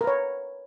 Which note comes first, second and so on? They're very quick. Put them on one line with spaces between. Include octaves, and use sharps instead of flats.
A#4 B4 C#5